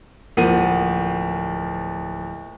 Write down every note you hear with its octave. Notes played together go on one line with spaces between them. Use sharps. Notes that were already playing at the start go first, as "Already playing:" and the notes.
D1 F3 A#3 F#5 D#7